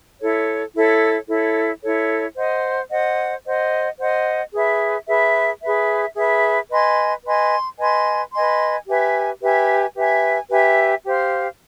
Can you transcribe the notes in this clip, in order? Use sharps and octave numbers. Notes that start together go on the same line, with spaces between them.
E4 A4 C#5
E4 A4 C#5
E4 A4 C#5
E4 A4 C#5
C5 D#5 F#5
C5 D#5 F#5
C5 D#5 F#5
C5 D#5 F#5
G#4 B4 E5
G#4 B4 E5
G#4 B4 E5
G#4 B4 E5
B4 D#5 G#5 C6
B4 D#5 G#5 C6
B4 D#5 G#5 C6
B4 D#5 G#5 C6
G4 B4 E5 G#5
G4 B4 E5 G#5
G4 B4 E5 G#5
G4 B4 E5 G#5
G4 C5 F5